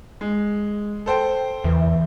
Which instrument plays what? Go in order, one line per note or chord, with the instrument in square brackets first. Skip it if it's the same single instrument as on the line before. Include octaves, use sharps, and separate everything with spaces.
[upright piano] G#3
A4 C5 G5
[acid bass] E2 [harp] E3